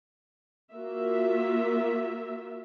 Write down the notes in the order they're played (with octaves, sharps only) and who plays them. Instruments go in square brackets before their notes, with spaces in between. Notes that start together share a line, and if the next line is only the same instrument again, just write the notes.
[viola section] A#3 F4 F#4 E5